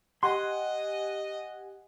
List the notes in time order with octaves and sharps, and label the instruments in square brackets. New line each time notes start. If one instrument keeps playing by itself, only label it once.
[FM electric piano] G4 F#5 G#5 [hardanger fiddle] D#5 [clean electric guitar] C6